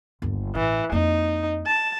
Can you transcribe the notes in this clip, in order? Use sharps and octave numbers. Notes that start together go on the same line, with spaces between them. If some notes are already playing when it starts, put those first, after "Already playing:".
G1 D#2
A1 E3
F2 A#3 D#4
A5